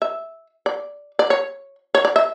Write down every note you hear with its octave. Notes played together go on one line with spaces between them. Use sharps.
E5
D5
D5
C#5
C#5
D5
E5